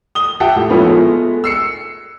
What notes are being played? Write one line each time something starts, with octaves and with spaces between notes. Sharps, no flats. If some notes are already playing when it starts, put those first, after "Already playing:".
D#6 G7
G4 E5 F#5 G5 A5
A2
A#2 F3 A3 B3 C#4 E4
G#3 A3 B3
E6 C7 C#7